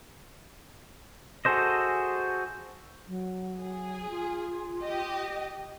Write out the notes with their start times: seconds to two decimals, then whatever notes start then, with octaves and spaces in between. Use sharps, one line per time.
1.45 F#4 G#4 A4 C5 D#5
3.08 F#3
3.61 G#4
4.10 F4
4.82 G4 D#5